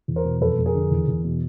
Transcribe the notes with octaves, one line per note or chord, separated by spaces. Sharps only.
E2
A#4 C5
B2
F2 A4 B4
F2
G#4 A#4
D3
E2
E2
B2